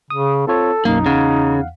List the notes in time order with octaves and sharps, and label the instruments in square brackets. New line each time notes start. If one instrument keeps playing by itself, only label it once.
[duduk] C#3 [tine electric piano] D#6
[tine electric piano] C4 F4 C#5 [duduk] A4
[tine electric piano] B1 F#2 [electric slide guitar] A#3 [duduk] D#4
[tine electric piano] E2 F5 F#5 [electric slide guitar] C#3